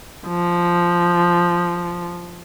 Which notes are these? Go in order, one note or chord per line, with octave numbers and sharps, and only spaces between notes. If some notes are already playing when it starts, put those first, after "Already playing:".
F3